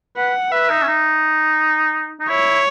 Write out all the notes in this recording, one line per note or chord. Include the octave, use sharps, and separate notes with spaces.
B4 F#5
B4 E5
D#4
C#4
D#4
D#4
E4 C#5